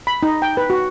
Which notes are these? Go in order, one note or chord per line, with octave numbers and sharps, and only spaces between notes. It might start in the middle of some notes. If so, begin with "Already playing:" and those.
B5
D#4
G5
B4
F#4